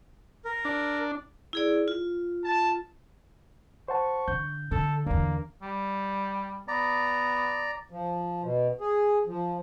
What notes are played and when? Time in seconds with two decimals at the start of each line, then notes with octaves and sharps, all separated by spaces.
0.45 A#4
0.65 D4
1.53 E4 G#4 D5
1.88 F4
2.44 A5
3.88 C5 F#5 A5 C#6
4.28 D3 G6
4.71 D3 A4
5.06 E2 D3 A#3 D4
5.62 G3
6.68 B3 D5 A#5
7.91 F3
8.42 B2
8.81 G#4
9.27 F3